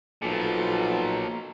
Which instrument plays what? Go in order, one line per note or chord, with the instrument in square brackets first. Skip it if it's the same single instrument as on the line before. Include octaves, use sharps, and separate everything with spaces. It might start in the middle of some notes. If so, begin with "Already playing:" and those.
[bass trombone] B1 [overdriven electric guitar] A#2 F3 [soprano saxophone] A4